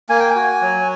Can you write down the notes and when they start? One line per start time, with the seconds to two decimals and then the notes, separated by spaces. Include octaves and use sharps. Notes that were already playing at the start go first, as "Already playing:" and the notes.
0.09 A#3 G#5
0.20 G5
0.30 G#5
0.36 F#4
0.62 F#3